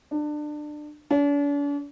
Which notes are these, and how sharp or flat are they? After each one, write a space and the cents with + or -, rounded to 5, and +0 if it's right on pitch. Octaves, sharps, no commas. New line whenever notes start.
D4 +25
D4 -45